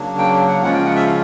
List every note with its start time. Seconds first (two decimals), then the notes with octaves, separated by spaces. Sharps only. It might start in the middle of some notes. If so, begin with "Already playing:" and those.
Already playing: C#3 F#3 A#3 D4
0.18 G5
0.48 F#5
0.62 C#3 F3 G#3 C#4 F4 F#5
0.74 G5
0.85 F#5
0.96 E5
1.07 F5